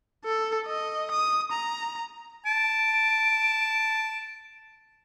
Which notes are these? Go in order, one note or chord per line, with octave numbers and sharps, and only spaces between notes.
A4
D#5
D#6
A#5
A5 D7